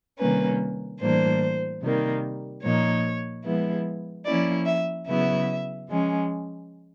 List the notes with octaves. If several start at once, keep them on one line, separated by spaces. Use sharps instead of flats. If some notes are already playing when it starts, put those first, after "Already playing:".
C3 D#3 G3 A#3 C#4 B4
A2 E3 G3 A#3 D4 C5
C3 D#3 G3 A#3
A#2 F3 A#3 D#4 C#5
F3 G#3 B3 E4
F3 A#3 C#4 E4 D5
E5
C#3 F#3 B3 E4 E5
F3 G#3 C#4